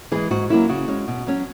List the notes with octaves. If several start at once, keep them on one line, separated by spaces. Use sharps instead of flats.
E3 G#3 G#4
G#2 F#4
F#3 A#3 C#4 E4
C#3 F#4
G#3 C#4
B2
F#3 C#4